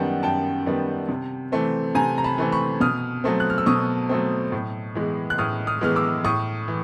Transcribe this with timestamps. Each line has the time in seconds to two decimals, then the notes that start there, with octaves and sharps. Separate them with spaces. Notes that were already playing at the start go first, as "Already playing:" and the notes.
Already playing: F#2 D#3 G3 B3 F#5 G5 A5
0.23 F#2 G5 A5
0.66 D#3 G3 B3
1.09 C3
1.52 E3 A3 C4
1.95 C3 G#5 A#5
2.18 A#5
2.24 A5 B5
2.38 E3 A3 C4
2.52 B5 C#6
2.81 B2 D#6 F6
3.24 F#3 A3 C4
3.40 F#6
3.50 F6
3.58 E6
3.66 B2 C#6 D#6
4.09 F#3 A3 C4
4.52 A2
4.95 E3 G#3 B3
5.30 F#6
5.38 A2 D#6 F6
5.67 D#6 F6
5.81 E3 G#3 B3 F6
5.96 D6 E6
6.24 A2 C#6 D#6
6.68 E3